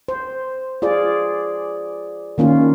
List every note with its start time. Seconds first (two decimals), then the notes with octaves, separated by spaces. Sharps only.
0.08 C5
0.82 F4 G#4 D5
2.38 D#3 A#3 C#4 F4